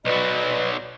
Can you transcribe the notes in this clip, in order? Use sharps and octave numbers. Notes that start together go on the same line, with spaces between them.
B1 F#3 B4 D5 D#5